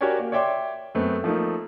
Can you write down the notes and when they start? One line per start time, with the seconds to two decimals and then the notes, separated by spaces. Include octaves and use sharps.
0.01 F#4 G4 A#4 C#5 D5 G#5
0.19 A#3
0.32 C#5 D5 E5 G5 C6 D6
0.95 F#2 A3 B3 C4
1.24 F3 A3 A#3 D#4